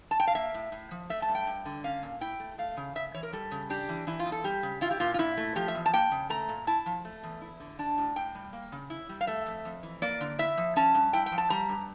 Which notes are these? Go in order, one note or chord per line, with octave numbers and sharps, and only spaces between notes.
A5
G5
F5
A#3 E5
A2
A2
F3
A3 E5
A5
G2
G5
G2
D3
C#4 F5
A#2
E4 G5
A3
A3 F5
C#3
C#3 E5
E3 C#5
A#4
G3 A4
C#3
D4 G4
E3
E3 E4
F4
E2
A4
G3 G4
C#3
E4 F4
G4
A#2 F4
F4
A#2 E4
A3
F3 G4
E5
E2
A5
A#3 G5
C#3
A3 A#5
A#2
E4 A5
F3
A3
E2
E4
D3
D4 A5
A2
A2 G5
G3
A#3
C#3
E4
G3
F5
A3 E5
F2
F2
E3
A#3 D5
D3
E4 E5
F3
C#4 A5
G2
E4 G5
G5
F3
A5
G3 A#5
G2